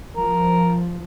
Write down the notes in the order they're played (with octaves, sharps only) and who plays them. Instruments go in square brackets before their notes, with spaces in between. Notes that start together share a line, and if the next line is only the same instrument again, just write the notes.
[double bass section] F3 [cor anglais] A#4